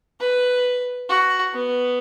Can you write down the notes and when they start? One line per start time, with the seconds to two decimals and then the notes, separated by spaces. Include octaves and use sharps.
0.20 B4
1.09 F#4
1.54 B3